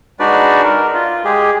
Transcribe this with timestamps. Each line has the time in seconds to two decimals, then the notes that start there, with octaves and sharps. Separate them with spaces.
0.20 G#3 D4 D#4 F#4 B4 D5
0.64 A#4
0.94 F4
1.25 G#3 G4 G#4